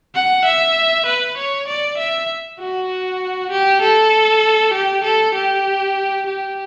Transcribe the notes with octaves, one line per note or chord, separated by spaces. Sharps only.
F#5
E5
B4
C#5
D5
E5
F#4
G4
A4
G4
A4
G4
G4